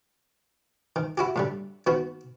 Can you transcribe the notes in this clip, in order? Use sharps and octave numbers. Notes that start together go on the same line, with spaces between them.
D#3
E4 F#4 G4
A2 D3 G3
D#3 B3 F#4